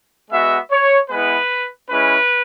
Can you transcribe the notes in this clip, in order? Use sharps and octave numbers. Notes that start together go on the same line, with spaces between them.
G#3 B3 F#4 E5
C#5
G#3 B3 E4 B4
G#3 C#4 E4 B4